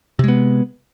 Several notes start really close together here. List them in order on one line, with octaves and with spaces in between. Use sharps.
C3 G#3 B3